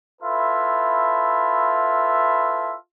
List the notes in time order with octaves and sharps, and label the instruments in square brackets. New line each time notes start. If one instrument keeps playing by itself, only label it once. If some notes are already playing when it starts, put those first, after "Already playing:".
[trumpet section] E4 F4 A4 B4 E5